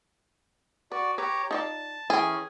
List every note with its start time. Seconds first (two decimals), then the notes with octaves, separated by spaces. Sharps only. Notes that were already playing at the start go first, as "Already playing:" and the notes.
0.92 F#4 B4 D5
1.18 G4 B4 C#5 A#5
1.51 D#4 F4 D5 A5
2.10 E3 C#4 G#4 A4 G5